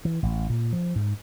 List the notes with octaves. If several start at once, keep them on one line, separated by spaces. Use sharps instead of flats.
E3
A1
A#2
F3
G#2